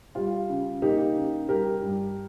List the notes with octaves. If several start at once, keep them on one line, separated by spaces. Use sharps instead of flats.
G3 F4
C#3
A#3 D#4 G4
C#3
G3 G4 A#4
G2